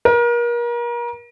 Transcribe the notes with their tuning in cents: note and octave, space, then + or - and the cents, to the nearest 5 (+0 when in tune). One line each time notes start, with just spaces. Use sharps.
A#4 +35